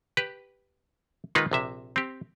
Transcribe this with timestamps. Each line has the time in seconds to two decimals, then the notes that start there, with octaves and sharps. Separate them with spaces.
0.17 G4 B4
1.35 D#3 G#3 A#3 D#4 F4 B4
1.51 A#1 C3 E5
1.96 C4 G4